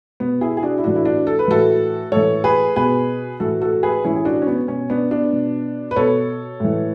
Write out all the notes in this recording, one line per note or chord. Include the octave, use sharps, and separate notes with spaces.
B2 B3
E4 G#4
G#4
D4 F#4
E4
A2 E3 D4 F#4
E4
D4 F#4
A4
B4
A2 E3 F#4 A4
A2 E3 A4 C#5
G#4 B4
B2 G#4 B4
A2 E3 F#4 A4
F#4 A4
G#4 B4
A2 E3 C#4 E4
G#4
D4 F#4
C#4
B3
B2 C#4
B3 D4
B3 D4
B2
B4
B2 A4 C#5
A2 E3